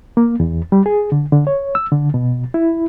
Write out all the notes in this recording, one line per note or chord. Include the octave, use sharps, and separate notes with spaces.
A#3
E2
G3
G#4
D3
D3
C#5
E6
D3
B2
E4